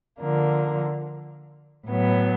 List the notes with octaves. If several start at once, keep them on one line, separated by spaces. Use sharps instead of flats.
D3 F3 A#3
A2 F#3 B3